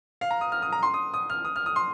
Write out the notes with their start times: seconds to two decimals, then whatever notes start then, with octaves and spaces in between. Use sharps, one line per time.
0.21 F5
0.31 A#5
0.41 D#6
0.52 F6
0.62 D#6
0.72 A#5
0.83 C6
0.94 D#6
1.14 D#6
1.30 F6
1.45 D#6
1.56 F6
1.66 D#6
1.76 C6